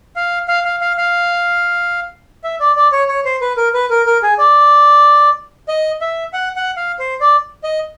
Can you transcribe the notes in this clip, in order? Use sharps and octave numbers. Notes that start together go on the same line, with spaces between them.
F5
F5
F5
F5
F5
E5
D5
D5
C#5
C#5
C5
B4
A#4
B4
A#4
A#4
G#4
D5
D#5
E5
F#5
F#5
F5
C5
D5
D#5